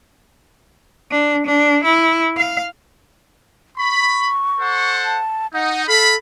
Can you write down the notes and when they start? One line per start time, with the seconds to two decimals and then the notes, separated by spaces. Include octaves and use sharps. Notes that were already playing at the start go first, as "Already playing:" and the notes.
1.11 D4
1.46 D4
1.84 E4
2.37 F5
3.78 B5 C#6
4.60 A4 C5 F#5
5.05 A5
5.54 D#4 F#5
5.88 A4 F5 B5